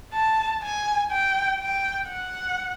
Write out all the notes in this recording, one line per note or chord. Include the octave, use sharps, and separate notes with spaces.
A5
G#5
G5
G5
F#5